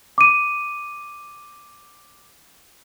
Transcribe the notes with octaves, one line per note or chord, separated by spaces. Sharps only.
D6 D#7